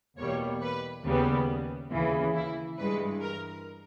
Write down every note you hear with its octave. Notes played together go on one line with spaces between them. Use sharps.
E2 B2 G3 A#3 C#5
B4
D#2 C#3 G3 B3
D#2 C#3 E3
E4
G2 E3 G#3 B4
A#4